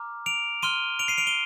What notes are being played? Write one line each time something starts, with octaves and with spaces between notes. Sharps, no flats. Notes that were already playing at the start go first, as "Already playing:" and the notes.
Already playing: A#5 D6 F6
D7 F7
C6 F6 D#7 G7
D7 F7
C7 D#7
D7 F7
D#7 G7